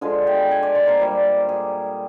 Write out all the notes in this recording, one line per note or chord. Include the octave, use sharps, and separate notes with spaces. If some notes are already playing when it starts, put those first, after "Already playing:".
D3 F3 G#3 G#4
G5
G#5
D5
C5
A#4
A#2 G3
G#4